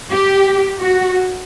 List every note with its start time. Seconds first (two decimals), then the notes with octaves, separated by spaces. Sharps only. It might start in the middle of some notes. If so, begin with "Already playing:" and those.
0.10 G4
0.82 F#4